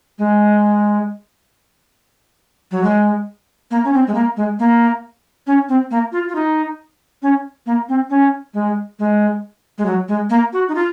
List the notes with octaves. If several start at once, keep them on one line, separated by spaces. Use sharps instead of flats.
G#3
F#3
G#3
A#3
C#4
C4
G#3
A#3
G#3
A#3
C#4
C4
A#3
F4
F4
D#4
C#4
A#3
C4
C#4
G#3
G#3
G#3
F#3
G#3
A#3
F#4
D#4
F4